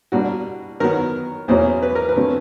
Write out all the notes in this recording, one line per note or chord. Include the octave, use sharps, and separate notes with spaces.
B2 G3 A#3 D4 F#4
D#3 F#3 B3 A#4
E2 B2 F#3 A#3 C#4 C5
B4
A#4
B4
D3 F#3 A3 C4